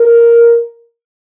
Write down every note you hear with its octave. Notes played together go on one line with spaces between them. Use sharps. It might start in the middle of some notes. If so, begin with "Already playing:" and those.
Already playing: A#4